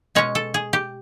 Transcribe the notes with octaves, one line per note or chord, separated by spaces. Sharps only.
B2 G#3 C#4 C#5
A4
G#4
G4